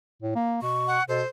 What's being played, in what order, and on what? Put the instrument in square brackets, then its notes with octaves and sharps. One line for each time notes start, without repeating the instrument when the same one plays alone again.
[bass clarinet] A2
A#3
[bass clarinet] B2 [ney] C#6
[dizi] F#5
[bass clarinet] B2 [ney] A4 [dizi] C5